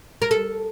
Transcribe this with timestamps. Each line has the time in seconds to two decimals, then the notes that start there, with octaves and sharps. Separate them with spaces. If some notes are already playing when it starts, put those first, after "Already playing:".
0.22 A#4
0.31 A4